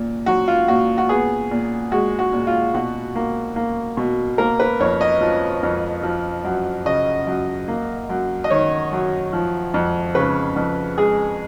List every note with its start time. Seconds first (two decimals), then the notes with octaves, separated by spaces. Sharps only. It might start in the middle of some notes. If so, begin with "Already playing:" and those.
Already playing: A#2
0.26 F#3 F#4
0.48 F4
0.68 A#2 F#4
0.98 F#4
1.09 B3 G#4
1.51 A#2
1.92 G#3 F#4
2.19 F#4
2.33 A#2
2.47 F4
2.74 B2 F#4
3.15 A#3
3.56 A#3
3.97 B2
4.38 A#3 A#4
4.60 B4
4.80 F2 C#5
5.01 D#5
5.21 F3
5.63 F2
6.03 F3
6.45 F#2
6.86 C#3 D#5
7.27 F#2
7.68 A#3
8.10 F#2
8.44 D#5
8.50 D#3 C#5
8.92 F#2
9.33 F3
9.74 F2
10.15 C#3 B4
10.56 F2
10.97 G#3 G#4